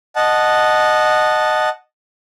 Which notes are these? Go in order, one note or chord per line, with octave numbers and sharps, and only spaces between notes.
D#5 F#5 A5